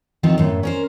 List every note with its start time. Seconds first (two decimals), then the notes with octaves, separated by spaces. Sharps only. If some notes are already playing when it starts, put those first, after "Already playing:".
0.23 D#3 F3 B3 C4
0.38 F#2 A2
0.63 C#4 A#4 C5